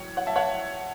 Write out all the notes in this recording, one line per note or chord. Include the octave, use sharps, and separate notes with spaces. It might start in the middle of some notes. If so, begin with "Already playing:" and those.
Already playing: A2 F#3 C#5
C#5 F#5
E5 A5
C#5 F#5